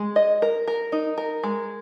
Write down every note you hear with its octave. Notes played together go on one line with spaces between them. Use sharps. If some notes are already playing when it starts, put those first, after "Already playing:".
Already playing: G#3
D#5
A#4
A#4
D#4
A#4
G#3